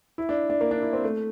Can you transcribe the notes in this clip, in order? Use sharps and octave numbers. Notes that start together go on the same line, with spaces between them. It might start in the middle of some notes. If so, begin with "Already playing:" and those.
E4
D4
D4
A#3
D4
E4
C4
A3